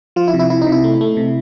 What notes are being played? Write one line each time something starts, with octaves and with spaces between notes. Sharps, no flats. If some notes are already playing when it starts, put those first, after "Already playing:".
F3 F4
E4
C3
E4
C3 E4
D#4
C3
E4
A3
A3
C3